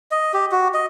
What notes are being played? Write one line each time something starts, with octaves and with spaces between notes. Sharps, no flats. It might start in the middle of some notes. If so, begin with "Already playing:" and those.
D#5
G4
F#4
D#5